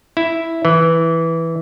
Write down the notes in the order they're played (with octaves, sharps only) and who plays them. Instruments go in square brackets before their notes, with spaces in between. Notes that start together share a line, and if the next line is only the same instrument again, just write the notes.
[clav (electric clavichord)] E4
E3